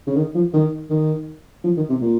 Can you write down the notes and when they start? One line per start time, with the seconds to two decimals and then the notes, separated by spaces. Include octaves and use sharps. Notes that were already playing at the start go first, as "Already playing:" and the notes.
0.07 C#3
0.16 D#3
0.35 F3
0.53 D#3
0.90 D#3
1.64 F3
1.77 D#3
1.89 C3
2.01 A#2